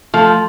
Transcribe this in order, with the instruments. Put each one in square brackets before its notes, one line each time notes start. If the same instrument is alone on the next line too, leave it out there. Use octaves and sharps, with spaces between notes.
[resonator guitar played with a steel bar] F3 [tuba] A3